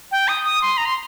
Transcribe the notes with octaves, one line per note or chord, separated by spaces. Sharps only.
G5
D#6
D#6
C6
A#5
C6